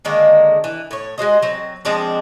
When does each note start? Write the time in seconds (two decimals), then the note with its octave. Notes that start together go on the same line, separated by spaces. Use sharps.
0.05 D3 D#3 G#3 A#3
0.64 E3
0.91 A2 C#5
1.18 G#3 F#4 C5 D#5
1.42 F#3 C4
1.85 F3 G#3 C4 D4